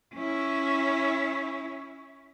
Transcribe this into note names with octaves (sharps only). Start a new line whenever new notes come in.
C#4 E4